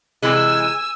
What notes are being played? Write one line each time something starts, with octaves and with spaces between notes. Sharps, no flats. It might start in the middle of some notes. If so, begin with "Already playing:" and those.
C3 E3 G#3 G#5 E6